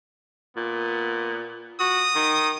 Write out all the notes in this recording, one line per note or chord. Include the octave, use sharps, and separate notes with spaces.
A#2 B3
F#4 D#6
D#3